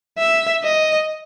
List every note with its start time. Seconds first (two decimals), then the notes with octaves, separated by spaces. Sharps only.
0.18 E5
0.64 D#5